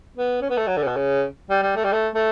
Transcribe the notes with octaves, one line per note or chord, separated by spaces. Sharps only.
B3
C#4
B3
A3
F#3
D3
C#3
B2
C#3
G3
G3
A3
G3
A3
A3